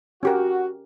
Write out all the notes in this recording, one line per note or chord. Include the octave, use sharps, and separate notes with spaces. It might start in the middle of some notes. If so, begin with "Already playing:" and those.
C#4 F#4 G4 A#4